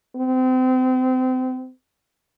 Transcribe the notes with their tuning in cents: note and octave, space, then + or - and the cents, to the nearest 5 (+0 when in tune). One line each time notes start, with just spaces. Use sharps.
C4 -30